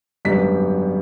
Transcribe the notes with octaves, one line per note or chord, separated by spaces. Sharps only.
G#1 F#2 D3 G3 B3 B6